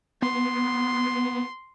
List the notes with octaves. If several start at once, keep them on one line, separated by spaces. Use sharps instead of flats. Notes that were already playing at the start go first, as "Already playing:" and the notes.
B3 C6